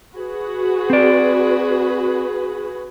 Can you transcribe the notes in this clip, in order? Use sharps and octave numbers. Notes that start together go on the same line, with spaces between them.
F#4 G#4 B4
C4 D5